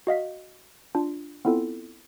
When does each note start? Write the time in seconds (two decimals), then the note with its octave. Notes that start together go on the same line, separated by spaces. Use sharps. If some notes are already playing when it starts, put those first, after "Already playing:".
0.07 F#4 D#5 F5 B6
0.95 D4 F4
1.45 B3 C4 E4 F4 A4